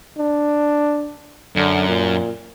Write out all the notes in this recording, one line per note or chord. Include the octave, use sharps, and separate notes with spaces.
D4
F#2 D3
A#2